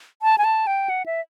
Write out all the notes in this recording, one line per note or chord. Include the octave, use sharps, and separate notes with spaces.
A5
G#5
A5
G5
F#5
E5